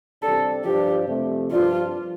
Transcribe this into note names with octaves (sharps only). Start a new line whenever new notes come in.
C3 G3 D4 A4
G2 F3 D4 G4
F2 C3 A3
G2 F3 D4 F4